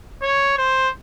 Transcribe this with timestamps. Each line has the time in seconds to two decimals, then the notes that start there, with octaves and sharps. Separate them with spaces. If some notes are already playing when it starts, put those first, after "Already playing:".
0.22 C#5
0.58 C5